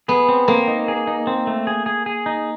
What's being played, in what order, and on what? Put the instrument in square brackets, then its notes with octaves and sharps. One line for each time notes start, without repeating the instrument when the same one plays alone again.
[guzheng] B3 [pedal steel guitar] G#4
[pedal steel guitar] C4
[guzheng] A#3 [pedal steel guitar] C4
[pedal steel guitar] D#4
G#4
D#4
C4
A3
G#4
G#4
G#4
D#4